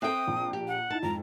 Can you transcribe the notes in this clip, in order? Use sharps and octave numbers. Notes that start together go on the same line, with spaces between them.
C4 A4 E5 G5 D#6 F#6
A#1
G4
F#5
D#4 E4 A5
F2 G#2 A#5